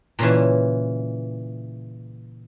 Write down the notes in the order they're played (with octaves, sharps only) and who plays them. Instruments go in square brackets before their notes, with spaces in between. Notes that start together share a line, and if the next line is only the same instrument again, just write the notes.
[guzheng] A#2 C#3 E3